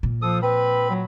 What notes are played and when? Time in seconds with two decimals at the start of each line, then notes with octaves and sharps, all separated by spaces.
0.03 A#2
0.22 F3 A4 D#6
0.42 C4 B4 B5
0.90 F#3